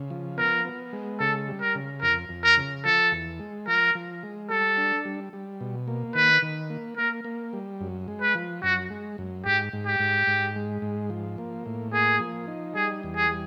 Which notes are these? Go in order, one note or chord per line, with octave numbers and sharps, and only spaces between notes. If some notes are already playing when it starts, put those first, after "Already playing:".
Already playing: C#3
F3
B3 A#4
B3
G#3
C#3 A4
G3
A#4
C#3
F2 A#4
F2
A#4
C#3
F3 A4
E2
G#3
F3 A#4
F3
G#3
G3 A4
D4
G3
G3
B2
A#3
D#3 B4
D#3
A#3
A#3 A#4
A#3
G3
F#2
G#3
B4
F3
F#2 F#4
G#3
F#2
G#2 G4
G#2
G4
G#2
G#2
G#3
G#2
F3
A#3
A2
A#3 G#4
F3
D#4
G3 G#4
E2
G#4
G3